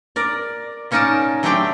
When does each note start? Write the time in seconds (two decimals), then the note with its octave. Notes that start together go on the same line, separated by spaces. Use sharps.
0.16 A#4 D5
0.91 C#3 C#4 D#4 A#4 D5 A5
1.43 F#3 A3 C4 D4 G4 G5